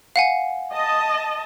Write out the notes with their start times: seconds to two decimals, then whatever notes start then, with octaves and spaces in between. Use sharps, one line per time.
0.16 F5 F#5 G#5
0.73 D#5 A5